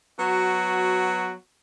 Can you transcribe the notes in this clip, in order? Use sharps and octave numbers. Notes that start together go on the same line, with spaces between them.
F#3 B3 F#4